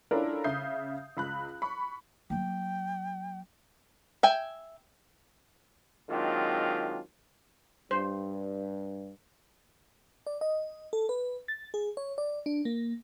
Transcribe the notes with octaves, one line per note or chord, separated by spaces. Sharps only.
C#4 D4 E4 F4 A4 A#4
C#3 E5 D#6 G6 C7
C#2 B5 F#6
B5 C#6
F#3 A#3 G5
E5 G5 G#5
D#3 F#3 G#3 C4 D4 F4
G2 C5
D5
D#5
A4
B4
A6
G#4
C#5
D5
D4
A#3